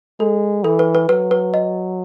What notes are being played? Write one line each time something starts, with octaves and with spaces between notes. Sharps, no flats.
G#3 A4
E3 A4
B4
B4
F#3 B4
B4
D#5